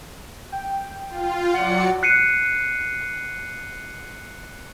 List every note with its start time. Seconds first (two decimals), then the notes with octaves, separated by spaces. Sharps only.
0.52 G5
1.10 F4
1.53 F#3 D5 F#5 C#7
2.03 F#6 C7 C#7 D#7